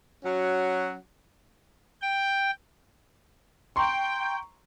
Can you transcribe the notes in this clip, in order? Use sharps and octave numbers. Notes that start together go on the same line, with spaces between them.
F#3 C#4 F#4
G5
G5 A#5 C6 C#6